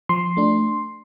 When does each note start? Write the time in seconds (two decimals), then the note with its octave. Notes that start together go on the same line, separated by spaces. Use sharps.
0.09 F3 C6
0.37 A3 D4